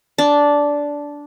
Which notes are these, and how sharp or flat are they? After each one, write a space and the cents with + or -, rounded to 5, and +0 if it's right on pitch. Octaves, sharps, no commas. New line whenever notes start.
D4 -10